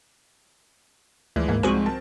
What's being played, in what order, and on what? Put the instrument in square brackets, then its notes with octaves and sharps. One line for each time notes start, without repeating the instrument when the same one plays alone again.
[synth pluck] D2 [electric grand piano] E3 F3 G#3
[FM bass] G#2 [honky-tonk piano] A#3
[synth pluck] C2 F#4 G#5 [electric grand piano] G#2 F3 [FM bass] G#3 [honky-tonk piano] C4
[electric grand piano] A#4 A5